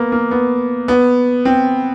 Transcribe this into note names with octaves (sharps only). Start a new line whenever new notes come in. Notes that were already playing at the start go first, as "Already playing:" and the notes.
Already playing: A#3 B3
A#3
B3
B3
C4